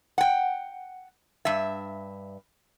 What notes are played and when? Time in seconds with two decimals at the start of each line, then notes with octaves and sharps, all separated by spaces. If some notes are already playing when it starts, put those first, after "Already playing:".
0.18 F#5 G5
1.45 G2 E5